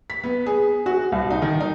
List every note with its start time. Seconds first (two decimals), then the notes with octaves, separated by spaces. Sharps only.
0.10 B6
0.23 B3
0.46 G#4
0.86 F#4
1.12 C2
1.30 D#4
1.42 D#3
1.60 D#4